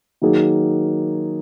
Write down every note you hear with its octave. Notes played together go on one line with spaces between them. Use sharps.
D#3 F#3 A#3 D#4 G#4